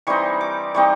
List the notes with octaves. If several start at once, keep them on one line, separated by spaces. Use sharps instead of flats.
E3 G3 C4 D#4 C#6
D6
E3 G3 C4 D#4 C#6